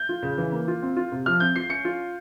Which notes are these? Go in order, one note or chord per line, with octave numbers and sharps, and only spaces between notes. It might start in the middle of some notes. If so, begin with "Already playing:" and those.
Already playing: G6
F4
C#3
E3
A#3
F4
C4
F4
C3
F3 F6
C4 G6
F4 C7
C#4 C#7
F4